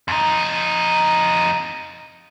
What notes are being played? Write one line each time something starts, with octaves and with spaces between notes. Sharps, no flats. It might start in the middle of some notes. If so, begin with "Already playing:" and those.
F2 D#4